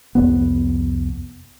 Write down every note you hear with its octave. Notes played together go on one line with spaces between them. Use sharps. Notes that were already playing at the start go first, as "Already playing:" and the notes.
C2 F2 B3